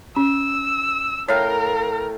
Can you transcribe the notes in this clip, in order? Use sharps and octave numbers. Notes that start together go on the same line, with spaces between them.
C#4 E6
A2 A#4 C#5 F5 G5